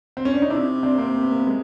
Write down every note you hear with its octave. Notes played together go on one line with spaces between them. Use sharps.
C4
C#4
D4
D#4
C3 D4 E4
C4 D4
A#3 C4
A#3
B3
A#3
B3
G#3